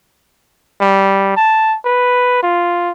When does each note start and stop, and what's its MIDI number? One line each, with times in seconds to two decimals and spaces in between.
0.81 1.33 55
1.36 1.77 81
1.85 2.39 71
2.43 2.92 65